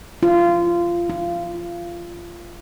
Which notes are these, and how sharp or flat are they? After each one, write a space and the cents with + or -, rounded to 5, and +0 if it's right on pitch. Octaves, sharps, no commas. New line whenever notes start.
F4 -20
F4 -20